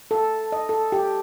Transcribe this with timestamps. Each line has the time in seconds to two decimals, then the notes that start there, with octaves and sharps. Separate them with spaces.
0.11 A4
0.52 D#5
0.69 A4
0.92 G4